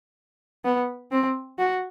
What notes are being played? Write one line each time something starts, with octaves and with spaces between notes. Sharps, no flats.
B3
C4
F#4